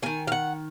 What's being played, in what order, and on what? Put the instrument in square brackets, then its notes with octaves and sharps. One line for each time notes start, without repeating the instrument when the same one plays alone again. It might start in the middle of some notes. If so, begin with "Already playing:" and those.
[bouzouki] D#3 A#3 G#5
F5
F#5